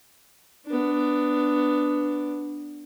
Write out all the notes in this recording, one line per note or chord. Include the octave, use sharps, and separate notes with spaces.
B3 D4